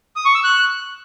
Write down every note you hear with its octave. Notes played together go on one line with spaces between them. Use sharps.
D#6
C#6
E6
F#6